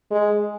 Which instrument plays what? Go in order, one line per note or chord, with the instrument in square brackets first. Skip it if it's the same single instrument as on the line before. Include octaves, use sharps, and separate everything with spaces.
[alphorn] G#3